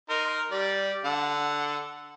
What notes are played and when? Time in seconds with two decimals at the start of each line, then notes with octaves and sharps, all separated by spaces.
0.10 D#4 A#4 C6
0.51 G3 D5
1.05 D3 A4 F#5